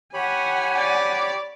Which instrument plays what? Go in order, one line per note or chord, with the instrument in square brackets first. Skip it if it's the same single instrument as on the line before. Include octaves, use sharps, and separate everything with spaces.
[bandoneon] G4 C#5 B5 [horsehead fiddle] F#5 G#5
[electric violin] D5